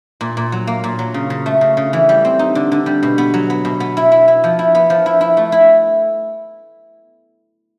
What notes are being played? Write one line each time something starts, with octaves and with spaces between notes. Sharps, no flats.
A#2
A#2
F#3
A#3
A#2
F#3
C#3
C#3
A3
C#3
C#3
E3
G3
C4
D#4
D3
D3
G3
B2
B3
F#3
B3
B2
B3
E4
E4
E4
F3
E4
B3
F3
E4
E4
A3
E4